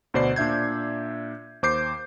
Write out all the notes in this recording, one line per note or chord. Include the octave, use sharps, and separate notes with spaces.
D2 B2 C5 D5 C7
A#2 D4 E5 G6 G#6
D#2 C5 D6 G6 C7